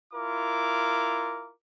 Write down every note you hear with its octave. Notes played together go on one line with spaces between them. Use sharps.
E4 F4 A#4 D6